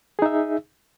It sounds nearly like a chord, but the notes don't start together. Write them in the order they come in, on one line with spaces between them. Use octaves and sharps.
G#4 D#4 E5